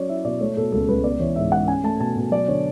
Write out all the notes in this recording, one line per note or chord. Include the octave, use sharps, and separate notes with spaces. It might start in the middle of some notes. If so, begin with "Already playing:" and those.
Already playing: F#3 C#4 C#5 D5
E4 E5
B2 D5
A3 C#5
B2 A4
C#2 A4
C#2 B4
B3 D5
E3 C#5
G#2 E5
G#2 F#5
C#4 G#5
A3 A5
B2 A5
B2
F#3 D5
D3 C#5